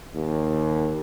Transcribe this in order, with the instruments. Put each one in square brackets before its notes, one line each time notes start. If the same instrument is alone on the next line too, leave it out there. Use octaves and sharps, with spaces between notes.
[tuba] D#2